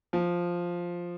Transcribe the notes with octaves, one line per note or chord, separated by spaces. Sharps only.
F3